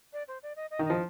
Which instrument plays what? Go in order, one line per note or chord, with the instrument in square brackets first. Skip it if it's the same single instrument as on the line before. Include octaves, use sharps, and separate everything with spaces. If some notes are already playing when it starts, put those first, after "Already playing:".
[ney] D5
C5
D5
D#5
D#5
[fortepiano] D#3
[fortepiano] F3 [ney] D#5